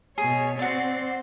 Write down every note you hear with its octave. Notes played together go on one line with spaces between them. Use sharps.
B2 G#4 C#5
C4 F#4 C5 D5